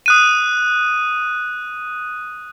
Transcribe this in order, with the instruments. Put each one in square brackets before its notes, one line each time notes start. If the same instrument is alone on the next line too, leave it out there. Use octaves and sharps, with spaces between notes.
[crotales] D#6 F#6 D#7